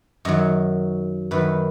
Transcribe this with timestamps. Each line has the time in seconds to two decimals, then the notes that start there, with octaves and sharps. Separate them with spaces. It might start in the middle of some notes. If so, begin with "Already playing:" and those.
0.25 F#2 D#3 F#3 D#5
1.31 F#2 D#3 F#3 B4